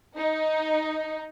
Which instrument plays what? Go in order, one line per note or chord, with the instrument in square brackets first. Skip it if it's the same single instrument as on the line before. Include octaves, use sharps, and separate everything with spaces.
[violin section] D#4